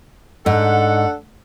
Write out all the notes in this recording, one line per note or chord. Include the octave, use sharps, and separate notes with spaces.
G#2 D4 A4 F#5